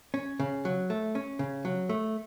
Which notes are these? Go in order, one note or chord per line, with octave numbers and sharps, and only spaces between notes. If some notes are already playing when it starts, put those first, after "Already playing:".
C#4
C#3
F#3
A3
C#4
C#3
F#3
A3